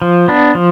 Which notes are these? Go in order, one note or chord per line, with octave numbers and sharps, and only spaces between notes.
F3
B3 D4
F3